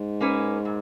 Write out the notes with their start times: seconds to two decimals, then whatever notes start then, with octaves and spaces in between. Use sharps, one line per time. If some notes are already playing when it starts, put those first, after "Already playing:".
Already playing: G#2
0.21 A#3 C#4 G#4 B4
0.65 A#2